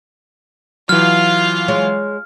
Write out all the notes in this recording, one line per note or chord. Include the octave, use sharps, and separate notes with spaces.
E3 F#3 F4 F5 F6
G#3 C#5